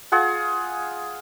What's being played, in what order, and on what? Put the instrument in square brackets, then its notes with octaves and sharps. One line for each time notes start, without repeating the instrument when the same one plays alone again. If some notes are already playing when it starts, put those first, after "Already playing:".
[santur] F4 G#4 F#5